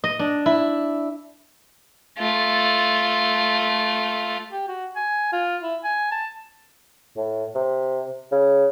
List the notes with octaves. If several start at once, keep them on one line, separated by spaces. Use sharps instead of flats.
D#5
D4
E4
A3 F4
G4
F#4
G#5
F4
E4
G#5
A5
A2
C3
C#3